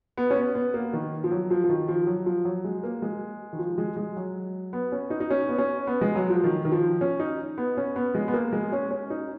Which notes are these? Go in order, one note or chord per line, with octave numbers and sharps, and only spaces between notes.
B3
C#4
B3
B3
A#3
D#3
F3
F#3
F3
F3
D#3
F3
F#3
F3
F#3
G#3
A#3
G#3
D#3
F3
G#3
G#3
F#3
B3
C#4
D#4
D#4
C#4
B3
C#4
B3
G#3
F#3
F3
D#3
D#3
F3
C#4
D#4
B3
C#4
B3
G#3
B3
A#3
G#3
C#4
C#4
D#4